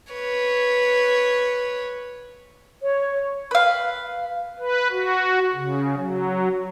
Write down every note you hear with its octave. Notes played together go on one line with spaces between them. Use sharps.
B4 C#5
C#5
B4 F5
B4
F#4
C#3
F#3